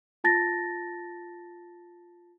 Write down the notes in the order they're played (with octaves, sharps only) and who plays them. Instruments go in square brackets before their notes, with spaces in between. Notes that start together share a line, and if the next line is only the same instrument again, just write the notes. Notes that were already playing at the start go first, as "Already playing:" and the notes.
[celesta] F4 A5 A6 A#6